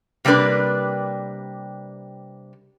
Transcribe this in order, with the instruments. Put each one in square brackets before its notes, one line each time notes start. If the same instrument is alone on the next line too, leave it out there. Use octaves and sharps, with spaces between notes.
[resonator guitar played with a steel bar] C3 G3 A#3 D4 B4